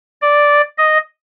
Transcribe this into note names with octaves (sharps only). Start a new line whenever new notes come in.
D5
D#5